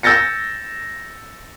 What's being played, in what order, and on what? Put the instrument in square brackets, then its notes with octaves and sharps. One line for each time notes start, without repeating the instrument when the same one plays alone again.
[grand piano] E6 G6 A6 A#6 C#7